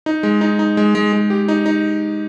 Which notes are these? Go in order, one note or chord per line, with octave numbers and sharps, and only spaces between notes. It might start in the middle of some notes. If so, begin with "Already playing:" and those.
D#4
G#3
D#4
D#4
G#3
G#3
G#3
G4
D#4
D#4